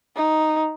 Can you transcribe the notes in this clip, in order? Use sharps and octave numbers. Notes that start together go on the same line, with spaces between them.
D#4